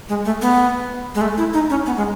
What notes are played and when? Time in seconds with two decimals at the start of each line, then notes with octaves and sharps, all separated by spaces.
0.09 G#3
0.25 A3
0.42 B3
1.15 G#3
1.21 A3
1.37 E4
1.53 D#4
1.70 C#4
1.86 B3
1.97 G#3